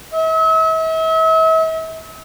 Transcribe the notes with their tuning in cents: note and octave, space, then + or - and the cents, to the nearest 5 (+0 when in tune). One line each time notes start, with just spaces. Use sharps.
E5 -40